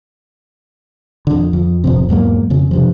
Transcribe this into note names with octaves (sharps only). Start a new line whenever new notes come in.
F2 D3
F2
D1 F2 C3
E2 G#2 F#3 A#3
F2 C#3
G2 C3 F3